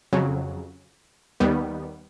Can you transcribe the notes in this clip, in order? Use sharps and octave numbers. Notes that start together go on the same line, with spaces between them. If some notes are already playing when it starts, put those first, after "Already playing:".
F2 C#3 F#3
D#2 D#3 G3 B3